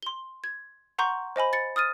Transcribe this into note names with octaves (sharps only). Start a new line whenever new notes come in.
C6 G7
G#6
F#5 A#5 C6 C#6 G6
C5 D#5 G#5 B5
A6 C#7
D#6 F6 A6 D#7